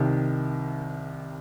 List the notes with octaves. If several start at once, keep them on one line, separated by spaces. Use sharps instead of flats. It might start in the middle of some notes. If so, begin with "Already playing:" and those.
Already playing: C2 C3 D#3